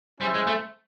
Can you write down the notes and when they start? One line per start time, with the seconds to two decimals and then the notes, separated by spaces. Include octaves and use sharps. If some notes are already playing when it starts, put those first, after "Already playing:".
0.20 G3 C#4 E4 G#4 C5 E5
0.34 G#3
0.47 A3